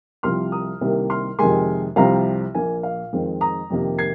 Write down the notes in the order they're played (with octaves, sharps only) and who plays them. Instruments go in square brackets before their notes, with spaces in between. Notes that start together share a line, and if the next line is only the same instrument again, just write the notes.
[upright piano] C2 C3 F3 C6 F6
A#5 D#6
C2 C3 D#3 A#3
C6 F6
F2 C3 D#3 G#3 G#5 C6
C2 C3 F3 C4 F5 A#5
A#1 A#2 A#3 G#5
F5
F2 D#3 G#3 C4
A#5 D#6
F2 C3 D#3 A#3
G#6 C7